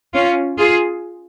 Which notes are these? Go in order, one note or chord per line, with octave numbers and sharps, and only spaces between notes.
C#4 F4
F4 G#4